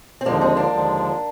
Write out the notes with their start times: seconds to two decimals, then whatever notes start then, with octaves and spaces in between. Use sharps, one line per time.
0.21 C4
0.26 D#2 D3 F3 G#3 A#3 D4
0.41 C4 D#4
0.56 A#3 D4
0.72 D#2 D3 F3 G#3